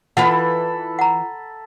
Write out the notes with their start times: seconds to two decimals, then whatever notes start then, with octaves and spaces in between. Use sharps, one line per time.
0.17 E3 F4 A4 B4 F#5 B5
0.99 F#5 A#5